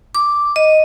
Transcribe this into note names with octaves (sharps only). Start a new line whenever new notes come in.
D6
D#5